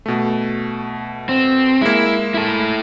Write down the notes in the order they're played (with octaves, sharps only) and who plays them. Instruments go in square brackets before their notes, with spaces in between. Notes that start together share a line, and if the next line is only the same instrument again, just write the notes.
[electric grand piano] B2 A3
[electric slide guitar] C4
[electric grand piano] G#3 A#3 [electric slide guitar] E4
[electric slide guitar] E4 A4